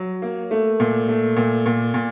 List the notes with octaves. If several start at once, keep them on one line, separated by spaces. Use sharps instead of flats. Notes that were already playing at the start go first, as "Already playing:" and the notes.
Already playing: F#3
A#3
A3
A#2
A3
A#2
A#2
A#2